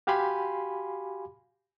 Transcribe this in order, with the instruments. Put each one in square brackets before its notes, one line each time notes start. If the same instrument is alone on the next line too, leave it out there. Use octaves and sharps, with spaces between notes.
[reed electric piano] F#4 G4 F5 G#5 B5 C6